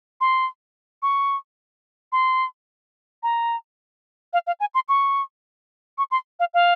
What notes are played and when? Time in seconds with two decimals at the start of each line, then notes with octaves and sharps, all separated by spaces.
0.21 C6
1.02 C#6
2.12 C6
3.23 A#5
4.33 F5
4.47 F5
4.60 G#5
4.74 C6
4.89 C#6
5.98 C#6
6.11 C6
6.40 F5
6.54 F5